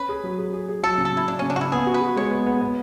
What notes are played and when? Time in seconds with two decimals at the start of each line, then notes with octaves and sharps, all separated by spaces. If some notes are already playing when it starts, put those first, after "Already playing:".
Already playing: C#4 B4
0.09 G#4
0.24 F#3
0.38 G#4
0.53 G#4
0.68 G#4
0.83 F#3 A4
0.98 C#3
1.05 A4
1.13 C#3 E4
1.28 C#3 D4
1.39 C#3 C#4
1.50 D4
1.56 C#3 E4 F#4
1.72 B3 G#4
1.86 F#4
1.94 B4
2.01 F#4
2.16 G#3 C#5
2.31 B3
2.46 B3
2.62 B3